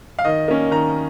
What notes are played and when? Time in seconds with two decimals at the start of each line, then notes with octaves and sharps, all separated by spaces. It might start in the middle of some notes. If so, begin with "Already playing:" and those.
0.19 F5
0.25 D#3 D#5
0.48 A#3 C#4
0.71 D#3 A#5